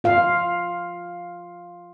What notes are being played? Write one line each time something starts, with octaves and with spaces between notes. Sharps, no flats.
F4 F5